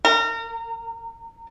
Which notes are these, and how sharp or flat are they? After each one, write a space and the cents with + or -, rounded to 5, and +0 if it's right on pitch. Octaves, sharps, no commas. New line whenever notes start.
A#4 -30